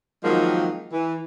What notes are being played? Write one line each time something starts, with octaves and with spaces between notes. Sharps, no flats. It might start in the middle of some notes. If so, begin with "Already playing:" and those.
D#3 F3 F#3 G#3 A#3 C4
E3